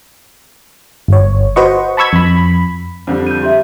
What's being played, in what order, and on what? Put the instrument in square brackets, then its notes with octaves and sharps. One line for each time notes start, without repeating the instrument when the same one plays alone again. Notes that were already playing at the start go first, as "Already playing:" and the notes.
[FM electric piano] G1 C#5
F#4 B4 C5 D#5 C#6
A5 B5 C#6 E6 G#6
F2 B5
[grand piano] F2 D3 G3
[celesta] G6 D#7
G4 E5